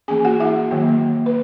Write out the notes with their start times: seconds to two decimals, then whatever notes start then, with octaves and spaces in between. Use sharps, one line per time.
0.08 E3 A#3 C#4 G#4 G#5
0.25 F#4 F#5
0.40 E4 E5
0.71 D#3 F#3 A#3
1.26 B4